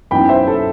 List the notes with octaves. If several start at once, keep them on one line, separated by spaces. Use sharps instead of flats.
F#2 E3 B3 D#4 G5 B5
C5 E5
A4